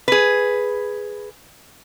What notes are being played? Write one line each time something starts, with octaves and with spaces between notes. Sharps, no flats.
G#4 B4